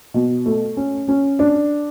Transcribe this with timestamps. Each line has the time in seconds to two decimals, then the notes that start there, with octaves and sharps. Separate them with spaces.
0.14 B2
0.46 A3
0.77 C#4
1.08 C#4
1.39 D4